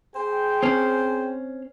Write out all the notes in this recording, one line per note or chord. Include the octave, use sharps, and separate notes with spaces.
G#4 C5 G5
C4 C#4